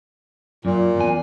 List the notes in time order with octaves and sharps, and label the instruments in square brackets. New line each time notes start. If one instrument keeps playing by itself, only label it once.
[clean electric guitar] F#2 [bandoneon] A#2
[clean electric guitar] E2 G#5